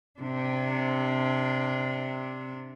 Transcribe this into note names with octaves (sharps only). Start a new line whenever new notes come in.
C3 D4